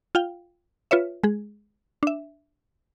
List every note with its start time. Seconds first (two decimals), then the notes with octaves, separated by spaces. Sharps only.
0.15 F4 F5 G5
0.91 F4 B4 C#5 E5
1.23 G#3 G#4
2.03 D4 E5